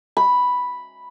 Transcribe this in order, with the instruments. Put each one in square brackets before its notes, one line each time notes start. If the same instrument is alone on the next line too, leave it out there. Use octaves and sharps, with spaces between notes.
[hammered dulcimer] B5